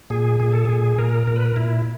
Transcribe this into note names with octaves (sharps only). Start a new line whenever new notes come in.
A#2 G#4
A#2 G#4
A4
A#2 G#4
A#2 A#4
A#2 A#4
B4
A#4
A#2 E4